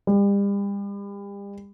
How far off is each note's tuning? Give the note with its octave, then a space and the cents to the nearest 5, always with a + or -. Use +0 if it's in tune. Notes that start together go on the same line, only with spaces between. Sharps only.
G3 +40